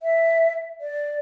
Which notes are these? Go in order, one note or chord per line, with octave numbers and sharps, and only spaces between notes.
E5
D5